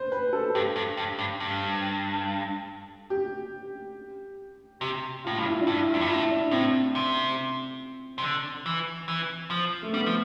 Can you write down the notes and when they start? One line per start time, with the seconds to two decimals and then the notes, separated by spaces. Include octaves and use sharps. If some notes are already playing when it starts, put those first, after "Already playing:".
Already playing: B4 C5
0.12 B4
0.33 A4
0.55 G2 G4
0.76 G2
0.97 G2
1.19 G2
1.40 G2
3.10 G4
4.81 C3 G4
5.25 A2 F4
5.38 G2 F4
5.46 E4
5.61 D4
5.67 G2 E4
5.89 F4
5.94 F2
6.01 G2
6.09 A2 E4
6.31 D4
6.51 A2 C4
6.95 C3
8.18 C3
8.22 D3
8.66 E3
9.08 E3
9.50 F3
9.82 A3
9.93 G3 B3
10.06 F3